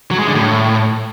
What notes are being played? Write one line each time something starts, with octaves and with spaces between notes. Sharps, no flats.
F#3
G#3
D3
A2